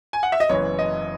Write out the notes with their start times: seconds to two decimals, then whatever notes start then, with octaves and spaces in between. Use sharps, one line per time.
0.13 G#5
0.23 F#5
0.32 E5
0.40 D#5
0.49 F#1 F#2 E3 B3 C#5
0.79 D#5